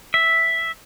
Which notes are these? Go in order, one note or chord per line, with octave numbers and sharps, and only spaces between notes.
E5